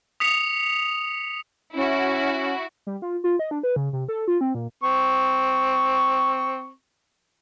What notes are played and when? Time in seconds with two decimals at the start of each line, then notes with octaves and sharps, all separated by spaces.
0.20 D#6 B6 C#7 F7
1.75 C#4 E4 F#4
2.87 G3
3.02 F4
3.24 F4
3.39 D#5
3.51 D4
3.63 B4
3.76 C#3
3.93 C3
4.08 A4
4.28 F4
4.41 C4
4.55 A#2
4.83 C4 C#6